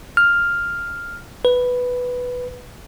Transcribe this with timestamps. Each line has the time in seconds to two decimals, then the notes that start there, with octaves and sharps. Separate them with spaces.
0.17 F6
1.45 B4